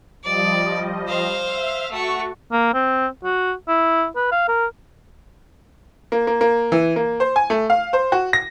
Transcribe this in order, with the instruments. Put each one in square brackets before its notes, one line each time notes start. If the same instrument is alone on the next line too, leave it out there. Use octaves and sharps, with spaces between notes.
[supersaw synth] F3 G3 D#5 [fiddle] D5
[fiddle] C5 F5
[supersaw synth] E5
[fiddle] A3 C#6 [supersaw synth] F#4
[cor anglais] A#3
C4
F#4
E4
B4
F5
A#4
[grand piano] A#3
A#3
A#3
E3
A#3
C5
G#5
A3
F5
C5
F#4
A#6